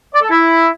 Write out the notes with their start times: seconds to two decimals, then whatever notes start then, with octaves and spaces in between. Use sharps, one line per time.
0.12 D5
0.21 A4
0.31 E4